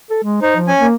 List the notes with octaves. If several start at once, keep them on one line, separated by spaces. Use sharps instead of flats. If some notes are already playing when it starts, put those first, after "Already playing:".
A4
G#3
D#4 C5
F3
C#4 G#5
A#3